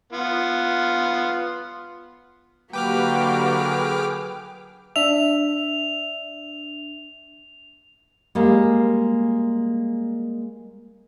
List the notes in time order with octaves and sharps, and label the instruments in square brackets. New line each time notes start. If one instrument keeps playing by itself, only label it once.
[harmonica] B3 F4
[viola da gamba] D3 F#3 A#3 [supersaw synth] G4 B4 [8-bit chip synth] G5 D6 F6
[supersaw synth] G#4 B4
[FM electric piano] D4 E5 [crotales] F7
[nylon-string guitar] G3 G#3 A#3